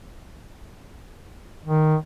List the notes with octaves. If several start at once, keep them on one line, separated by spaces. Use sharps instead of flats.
D#3